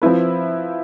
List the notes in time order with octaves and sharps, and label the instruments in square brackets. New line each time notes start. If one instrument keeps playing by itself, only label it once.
[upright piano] F3 C4 E4 B4